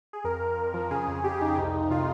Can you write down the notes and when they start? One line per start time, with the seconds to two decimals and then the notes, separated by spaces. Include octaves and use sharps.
0.13 G#4
0.24 F2 A#4
0.41 F2
0.58 F2
0.74 F3
0.91 C#3 G#4
1.08 F2
1.24 F2 G4
1.41 F2 D#4
1.57 C2
1.74 C2
1.90 C3 F4